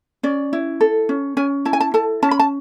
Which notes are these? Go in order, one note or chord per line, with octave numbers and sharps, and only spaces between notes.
C#4 D5
E4
A4
C#4
C#4 G#5
E4 A5
G#5
A5
A4 A5
C#4 A5
B5
A5